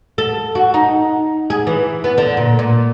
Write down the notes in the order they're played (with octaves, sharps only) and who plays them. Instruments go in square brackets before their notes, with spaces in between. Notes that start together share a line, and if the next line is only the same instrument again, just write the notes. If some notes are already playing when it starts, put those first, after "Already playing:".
[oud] A4
F#4
D#4
G#4
E3
B3
D3
A#2
A#2